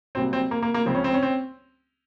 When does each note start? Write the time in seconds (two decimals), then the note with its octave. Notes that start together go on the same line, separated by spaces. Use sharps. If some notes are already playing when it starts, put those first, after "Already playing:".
0.15 C2 A#2 F#3 C4
0.33 C4
0.51 A#3
0.62 A#3
0.74 A#3
0.86 C#2 C#3 F3 C4
0.95 C#4
1.04 C4
1.14 C#4
1.23 C4